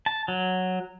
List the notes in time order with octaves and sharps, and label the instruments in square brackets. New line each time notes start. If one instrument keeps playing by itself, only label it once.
[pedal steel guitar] A5
F#3